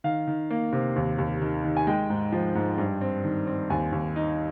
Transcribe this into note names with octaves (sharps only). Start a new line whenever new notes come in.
D#3 F5
D#3
A#3
C3
D#2
D#2
D#3
D#3
G#5
G#3 G5
G#2
F3
G#2
G2
C4
D#3
C4
D#2 G#5
D#2
D#4